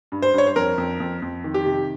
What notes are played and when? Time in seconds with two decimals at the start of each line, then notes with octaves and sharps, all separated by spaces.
0.12 G2
0.22 C5
0.34 G2 C#5
0.47 C5
0.56 F2 A#4
0.78 F2
1.00 F2
1.22 F2
1.44 D#3
1.54 G4
1.66 C3